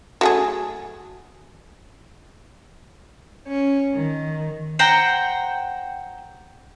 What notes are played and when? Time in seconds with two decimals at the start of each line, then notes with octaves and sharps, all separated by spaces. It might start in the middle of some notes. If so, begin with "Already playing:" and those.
0.21 F#3 A3 G#4
3.48 C#4
3.95 D#3
4.79 C5 F#5 G5 A#5